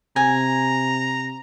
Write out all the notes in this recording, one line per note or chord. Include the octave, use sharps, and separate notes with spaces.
C3 G#5 A#5